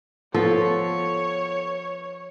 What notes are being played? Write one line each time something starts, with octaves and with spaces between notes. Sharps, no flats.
F3 B3 A4 C#5